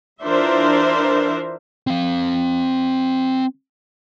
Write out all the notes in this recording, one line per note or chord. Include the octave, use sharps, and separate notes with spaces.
E3 D4 F4 A#4 C5 E5
C4 F5